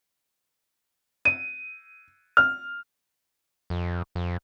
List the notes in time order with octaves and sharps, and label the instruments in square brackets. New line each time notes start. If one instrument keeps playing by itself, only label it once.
[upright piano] D#7
F6
[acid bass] F2
F2